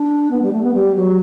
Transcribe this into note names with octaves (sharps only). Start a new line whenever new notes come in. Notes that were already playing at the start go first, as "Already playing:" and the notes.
Already playing: D4
B3
G3
A3
B3
G3
F#3